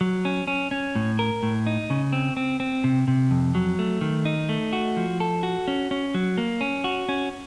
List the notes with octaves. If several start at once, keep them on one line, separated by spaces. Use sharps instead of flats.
F#3
C#4
C#4
C#4
A2
A#4
A2
D#4
C#3
C4
C4
C4
C3
C3
F2
F#3
A3
D#3
D#4
A3
F#4
F3
A4
F#4
C#4
C#4
F#3
A#3
C#4
F#4
C#4